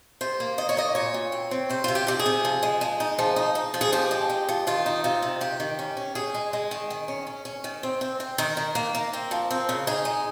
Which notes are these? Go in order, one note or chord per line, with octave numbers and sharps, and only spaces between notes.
C3 C5
A#3
D#3 D#5
C#5
A#3 D#5
A#2 C#5
A#2
C4
C4
C3 C5
C3 F4
G4
C3 G4
G#4
C3
F3
G#3
G#3
D#4
F3
D#4
D#4
F3
G#4
F3 G4
G#3
D#4
F3
D#3 F4
D#4
C3 F4
C3
D#3 G4
D#3
C#4
C#4
C#4 G#4
G#3
G#3
D#3
D#3
C#4
C#4
C#4
D#3
C4
C4
C4
D#3 A#4
D#3
A#3
A#3
C4
F3
C4
C#3
D#4 G#4
G#3